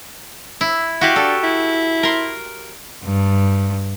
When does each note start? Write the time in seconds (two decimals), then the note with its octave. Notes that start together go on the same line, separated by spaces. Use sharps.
0.61 E4
1.01 E4 F#4 G4 F5
1.16 D4 A4
1.44 E4
2.03 A#4 C6
3.04 G2